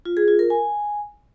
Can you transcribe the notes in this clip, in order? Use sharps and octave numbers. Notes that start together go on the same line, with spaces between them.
F4
G#4
F4
A#4
G#5